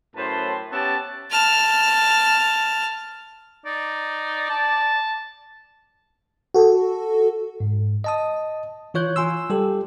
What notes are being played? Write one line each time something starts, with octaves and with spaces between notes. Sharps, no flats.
F#2 A2 B4 C5 A5 C6
B3 C#4 G4 E5 A5
A5 F6
D#4 D5
A5
F#4 A4
G#2
D#5 A5 D#6
E3 F4 C#5 F#6 G6
F4 G#5 C6 E6
G3 G4 A4